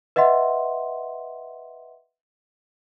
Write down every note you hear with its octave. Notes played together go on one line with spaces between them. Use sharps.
B4 D#5 E5 F#5 C6